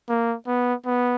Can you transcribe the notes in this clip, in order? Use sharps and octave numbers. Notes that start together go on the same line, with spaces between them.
A#3
B3
B3